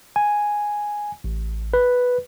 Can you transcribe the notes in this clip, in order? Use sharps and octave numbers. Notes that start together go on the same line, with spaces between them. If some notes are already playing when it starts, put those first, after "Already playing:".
G#5
A1
B4